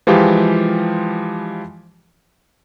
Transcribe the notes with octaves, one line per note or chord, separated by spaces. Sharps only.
E3 F3 G#3 F4 G4